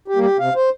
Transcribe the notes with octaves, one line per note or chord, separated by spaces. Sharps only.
G4
G3 A#3
G4
C3 F5
C5